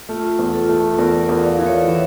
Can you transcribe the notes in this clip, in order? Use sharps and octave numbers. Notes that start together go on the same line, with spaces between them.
A3 F4
E2
F4 A4
A3
E2 A#4 D5
A#4 D5
E2
D5 F5
E3
C#5 E5
E3 C#5 E5